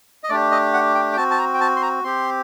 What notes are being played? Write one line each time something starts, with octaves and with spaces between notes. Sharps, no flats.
D#5
A3 D4 G4 D5
D#5
F#5
G5
G5
C4 F#4 A5
A5
A#5
G5
A5
C6
A#5
C4 G4 C6